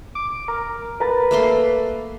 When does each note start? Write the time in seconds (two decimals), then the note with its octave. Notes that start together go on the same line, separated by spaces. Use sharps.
0.15 D6
0.48 A#4
1.00 A#4 B4 A#5 A6
1.31 A3 A#3 C6